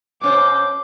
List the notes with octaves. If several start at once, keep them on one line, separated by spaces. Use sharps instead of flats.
B2 C#4 C5 D6